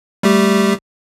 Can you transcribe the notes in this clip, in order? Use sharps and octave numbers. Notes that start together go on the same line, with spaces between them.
G3 A3 G4